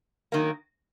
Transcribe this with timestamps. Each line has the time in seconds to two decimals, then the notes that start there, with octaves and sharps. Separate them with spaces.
0.32 D#3 F#3 A#3